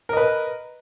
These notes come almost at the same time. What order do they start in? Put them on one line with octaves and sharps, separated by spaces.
A#4 D#5 B4